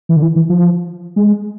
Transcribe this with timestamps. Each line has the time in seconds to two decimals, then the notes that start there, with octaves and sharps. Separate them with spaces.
0.09 E3
0.16 D3
0.22 E3
0.36 E3
0.50 F3
1.16 G#3